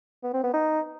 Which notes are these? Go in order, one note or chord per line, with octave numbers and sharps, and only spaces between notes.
B3
C4
B3
D#4